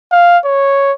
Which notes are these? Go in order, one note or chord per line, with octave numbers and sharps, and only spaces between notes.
F5
C#5